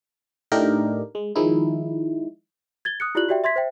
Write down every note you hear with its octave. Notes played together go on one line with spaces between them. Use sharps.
A2 A3 D4 D#4 G4 A#4
G#3
D#3 F3 G#3 D#4 E4
G#6 A6 G7
D#6 F#6 C#7
E4 F4 G4 D5 F#6 F#7
F#4 G4 D5 E5 G5
E5 C6 G#6 B6
C5 E5 G5